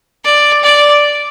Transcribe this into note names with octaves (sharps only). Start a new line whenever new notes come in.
D5
D5